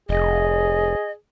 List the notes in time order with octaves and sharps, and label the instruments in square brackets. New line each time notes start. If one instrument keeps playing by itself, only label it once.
[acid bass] F1 [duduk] G#4 [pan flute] D#5